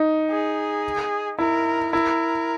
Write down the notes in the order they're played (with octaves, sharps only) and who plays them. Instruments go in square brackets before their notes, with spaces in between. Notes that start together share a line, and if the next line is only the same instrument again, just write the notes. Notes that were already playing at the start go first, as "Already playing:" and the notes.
Already playing: [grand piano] D#4
[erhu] G#4
[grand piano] E4 [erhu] A#4
[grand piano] E4 [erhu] A#4